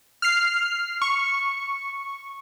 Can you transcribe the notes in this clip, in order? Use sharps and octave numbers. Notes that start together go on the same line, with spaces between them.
F6 C7
C#6